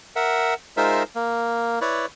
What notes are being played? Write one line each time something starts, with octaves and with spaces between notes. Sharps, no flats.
A#4 E5 F#5
G#3 D#4 F4 A#4 C5 E5
A#3
E4 B4 C#5 D5